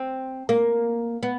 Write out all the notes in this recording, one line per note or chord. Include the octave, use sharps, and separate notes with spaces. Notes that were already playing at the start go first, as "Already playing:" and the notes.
Already playing: C4
A#3
B3